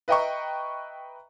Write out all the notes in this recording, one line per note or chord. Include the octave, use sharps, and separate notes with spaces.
B4 D#5 E5 G5 A#5 C#6